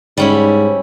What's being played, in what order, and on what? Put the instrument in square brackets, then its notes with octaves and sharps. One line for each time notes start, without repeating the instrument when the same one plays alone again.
[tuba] G#2 [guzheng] G3 C#4 E4